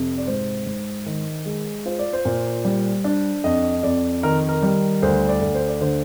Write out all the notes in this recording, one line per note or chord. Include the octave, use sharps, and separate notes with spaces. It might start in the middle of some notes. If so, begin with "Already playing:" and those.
Already playing: F2 C3
D5
G#2 C5
G#2
D#3
G#3
F4 C5
D5
C5
A#2
G3
D4
F2 D#5
F2 D5
D#3 A#4
A#4
G3
D2 C5
D5
D2
C5
D5
D3 C5